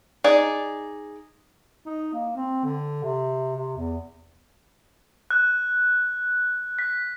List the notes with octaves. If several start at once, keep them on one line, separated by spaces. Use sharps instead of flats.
D#4 G#4 D5
D#4
A#3
C4
D3
C3
C3
E2
F#6
B6